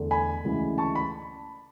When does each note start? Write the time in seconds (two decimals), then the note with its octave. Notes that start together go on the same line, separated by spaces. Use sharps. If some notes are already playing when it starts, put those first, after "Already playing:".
Already playing: E2 D3 A3
0.11 G#5 B5
0.44 D2 C#3 E3 G#3
0.78 A5 C#6
0.95 B5